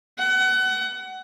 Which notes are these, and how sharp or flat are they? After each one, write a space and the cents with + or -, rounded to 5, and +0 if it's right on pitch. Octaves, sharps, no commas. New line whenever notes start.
F#5 +30